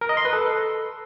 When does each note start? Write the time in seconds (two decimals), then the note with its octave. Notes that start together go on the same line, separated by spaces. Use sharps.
0.01 A#4
0.09 D#5
0.17 C6
0.25 B4
0.33 A4